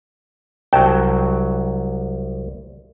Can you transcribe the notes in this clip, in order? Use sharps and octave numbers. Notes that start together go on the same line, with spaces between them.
C2 F#3 G5 A5